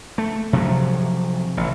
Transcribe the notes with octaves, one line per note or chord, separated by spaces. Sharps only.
A3
C3 F3 F#3
A1